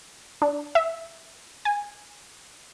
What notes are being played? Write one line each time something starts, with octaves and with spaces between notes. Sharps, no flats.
D4
E5
G#5